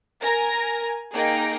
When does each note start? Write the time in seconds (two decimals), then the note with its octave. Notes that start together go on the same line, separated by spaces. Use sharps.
0.22 A#4 G#5 A#5 A#6
1.12 A#3 D#4 G#4 G5 A#6 D7